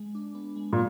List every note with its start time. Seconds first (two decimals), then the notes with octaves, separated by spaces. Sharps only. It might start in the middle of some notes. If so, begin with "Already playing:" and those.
Already playing: G#3
0.15 D4
0.35 B3
0.56 G#3
0.73 A#2